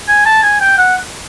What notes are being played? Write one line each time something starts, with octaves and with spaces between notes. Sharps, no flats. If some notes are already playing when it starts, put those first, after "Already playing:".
G#5
A5
G#5
G5
F#5